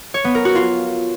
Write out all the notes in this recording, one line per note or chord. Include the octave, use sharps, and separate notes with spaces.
C#5
B3
A#4
F#4
F4